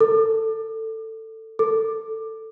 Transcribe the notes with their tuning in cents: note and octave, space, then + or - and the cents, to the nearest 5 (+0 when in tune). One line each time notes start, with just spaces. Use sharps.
A4 +15
A4 +10